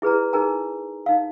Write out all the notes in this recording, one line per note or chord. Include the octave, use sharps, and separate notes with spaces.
E4 G#4 B4 D5 A#5
D#4 G#4 A#4 G#5 A#5
D#4 F5